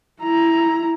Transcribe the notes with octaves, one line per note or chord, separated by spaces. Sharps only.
E4 A#5